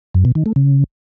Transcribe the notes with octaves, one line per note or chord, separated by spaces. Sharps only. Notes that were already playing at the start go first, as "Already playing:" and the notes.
F#2
B2
D#3
A3
C#3